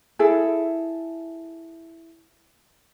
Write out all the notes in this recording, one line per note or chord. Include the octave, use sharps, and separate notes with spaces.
E4 G#4 A4